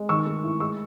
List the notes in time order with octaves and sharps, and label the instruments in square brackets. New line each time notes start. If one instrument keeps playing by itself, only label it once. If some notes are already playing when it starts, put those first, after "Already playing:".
Already playing: [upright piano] G#3
D#3 C#6 E6
A3
E4
G#3 C#6 E6